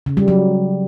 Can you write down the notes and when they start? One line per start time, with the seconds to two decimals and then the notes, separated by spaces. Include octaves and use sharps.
0.06 C#3
0.17 G3
0.28 F#3